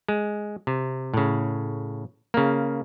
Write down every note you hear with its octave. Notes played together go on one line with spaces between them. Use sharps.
G#3
C3
A2 C#3
C#3 A#3